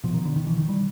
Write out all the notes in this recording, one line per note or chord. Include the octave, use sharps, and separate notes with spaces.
B2 F3
D#3
D3
D#3
E3
D#3
G3